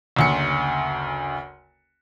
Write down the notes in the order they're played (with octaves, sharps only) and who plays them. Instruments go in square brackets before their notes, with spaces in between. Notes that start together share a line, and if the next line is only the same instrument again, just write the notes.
[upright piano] F#1 D2 C#7